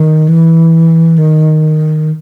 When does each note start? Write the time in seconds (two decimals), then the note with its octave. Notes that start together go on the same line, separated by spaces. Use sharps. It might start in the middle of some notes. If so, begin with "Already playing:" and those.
Already playing: D#3
0.28 E3
1.18 D#3